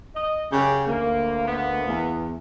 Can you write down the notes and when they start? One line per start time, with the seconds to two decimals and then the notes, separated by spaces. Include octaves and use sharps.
0.16 D#5
0.52 F#2 C#3 G4
0.87 D2 A#3
1.48 A#3 B3
1.87 E2